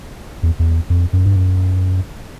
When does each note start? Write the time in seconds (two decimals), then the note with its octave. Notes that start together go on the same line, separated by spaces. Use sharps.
0.43 E2
0.59 E2
0.90 F2
1.13 F#2
1.26 G2
1.36 F#2